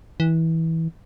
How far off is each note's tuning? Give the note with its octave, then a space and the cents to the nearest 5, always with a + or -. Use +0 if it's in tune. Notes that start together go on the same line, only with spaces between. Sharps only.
E3 -20